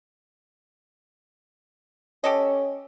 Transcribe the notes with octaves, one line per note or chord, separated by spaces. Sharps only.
C#4 G4 A4 D#5